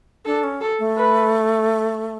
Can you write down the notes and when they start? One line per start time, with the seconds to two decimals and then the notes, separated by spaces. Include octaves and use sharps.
0.25 D4 A4
0.43 C#4
0.61 A4
0.79 A3
0.97 B4